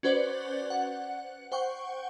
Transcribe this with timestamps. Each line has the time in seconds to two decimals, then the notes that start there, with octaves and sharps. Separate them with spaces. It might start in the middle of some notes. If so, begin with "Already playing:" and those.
0.03 C#4 F#4 B4 C5 D5
0.70 F#5
1.52 C5 F#5 G5 C#6